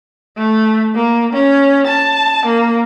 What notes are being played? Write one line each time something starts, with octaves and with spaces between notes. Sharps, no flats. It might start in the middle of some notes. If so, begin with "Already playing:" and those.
A3
A#3
C#4
A5
A#3